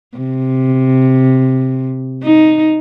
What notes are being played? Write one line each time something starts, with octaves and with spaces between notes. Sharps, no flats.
C3
D#4